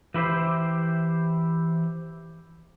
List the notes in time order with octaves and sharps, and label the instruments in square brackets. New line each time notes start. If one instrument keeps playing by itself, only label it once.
[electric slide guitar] E3 E4 G4 C5